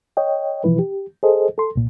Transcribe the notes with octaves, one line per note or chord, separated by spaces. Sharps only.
C#5 D#5 G5
B2 E3 F3 E4 B4
G4
G#4 A4 C5 D#5
A4 C6
C2 A#2